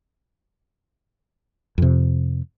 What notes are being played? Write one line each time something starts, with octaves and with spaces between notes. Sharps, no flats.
F2 C3